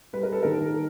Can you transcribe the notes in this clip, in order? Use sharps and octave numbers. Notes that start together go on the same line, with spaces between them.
G3 B4
A#4
A4
D#3 A#4